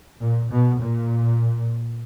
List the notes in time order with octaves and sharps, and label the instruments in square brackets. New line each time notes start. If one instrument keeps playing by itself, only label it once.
[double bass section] A#2
B2
A#2